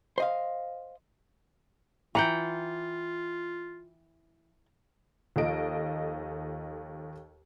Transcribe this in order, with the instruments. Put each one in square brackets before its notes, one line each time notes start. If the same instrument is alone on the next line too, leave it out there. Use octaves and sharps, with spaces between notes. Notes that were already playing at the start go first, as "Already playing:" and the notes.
[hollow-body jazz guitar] C5 D#5 F5
[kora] E3 F#5 G5 [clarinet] F4 [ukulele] A#5
[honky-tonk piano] D#2 F3 A4 D#5 D7